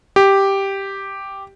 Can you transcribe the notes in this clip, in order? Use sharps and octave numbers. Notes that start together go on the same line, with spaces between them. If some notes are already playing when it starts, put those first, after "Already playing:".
G4